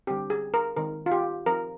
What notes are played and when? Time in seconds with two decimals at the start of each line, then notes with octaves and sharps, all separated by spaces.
0.07 D3 G3 C4 G4
0.30 G#4
0.54 A#4
0.76 D#3 G#3 C4 A#4
1.06 F4
1.12 G4
1.46 F3 C4 A#4